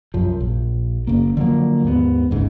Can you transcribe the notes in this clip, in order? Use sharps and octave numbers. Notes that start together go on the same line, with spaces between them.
C2 F#2 F3
A#1
F#1 C#3 A#3
D3 F3 F#3 A#3
D#2 G#2 G3 B3
G#1 D2 G#2 C#3